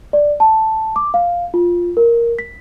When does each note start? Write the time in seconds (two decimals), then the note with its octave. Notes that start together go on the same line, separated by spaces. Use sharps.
0.13 D5
0.40 A5
0.96 D6
1.14 F5
1.54 F4
1.97 A#4
2.39 B6